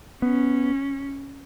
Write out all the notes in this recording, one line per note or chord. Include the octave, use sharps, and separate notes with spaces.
B3 C#4